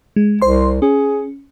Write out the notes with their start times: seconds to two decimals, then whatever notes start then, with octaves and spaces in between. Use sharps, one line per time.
0.16 G#3
0.42 C2 C5 C6
0.82 C#4 G#4